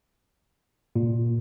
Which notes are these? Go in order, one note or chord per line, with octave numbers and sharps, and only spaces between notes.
A#2